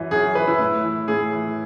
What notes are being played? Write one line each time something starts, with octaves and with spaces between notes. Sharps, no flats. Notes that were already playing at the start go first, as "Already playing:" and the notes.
Already playing: F#2 E3
F#2 G#4
E3 B4
E4
A2
E3
A2 G#4
E3